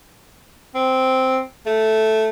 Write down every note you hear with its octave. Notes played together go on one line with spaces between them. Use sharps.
C4
A3